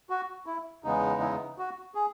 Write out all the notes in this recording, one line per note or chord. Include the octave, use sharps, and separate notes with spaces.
F#4
E4
E2 C#3 G#3 B3 D#4
E4
F#4
G#4